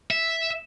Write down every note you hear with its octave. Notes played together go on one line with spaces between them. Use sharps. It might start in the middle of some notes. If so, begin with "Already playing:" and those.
E5